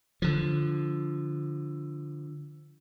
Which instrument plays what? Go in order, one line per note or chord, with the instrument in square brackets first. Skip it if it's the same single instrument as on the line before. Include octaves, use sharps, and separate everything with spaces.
[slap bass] D3 F3